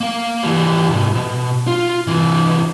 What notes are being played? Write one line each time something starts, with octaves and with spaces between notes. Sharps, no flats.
A#3 F5
E3 G3
C2 G#2
B2
F4
C2 E3